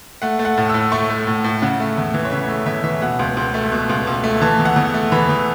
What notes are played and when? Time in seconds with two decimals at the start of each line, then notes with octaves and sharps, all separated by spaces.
0.22 A3 F#5
0.39 A3
0.45 F#5
0.58 A2
0.69 A2 E6
0.92 A3 C#6
1.10 A3
1.27 A2
1.44 A2
1.62 C#3 F#5
1.80 A3
1.98 E2
2.14 E3
2.25 C#5
2.31 C#3 E5
2.49 A3
2.66 E2 E5
2.84 E3 E5
3.02 B2 F#5
3.19 C#2
3.37 C#2
3.54 A3
3.72 B2
3.89 C#2
4.07 C#2
4.24 A3
4.42 E3 A5
4.59 E2
4.65 F#5
4.76 E2
4.94 A3
5.12 E3 B5
5.29 E2